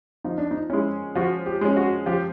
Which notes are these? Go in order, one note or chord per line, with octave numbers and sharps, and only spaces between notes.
F3 D#4
D4
D#4
G#3 C#4 E4
F3 F#4
G4
G#3 C#4
F#4
F3 G4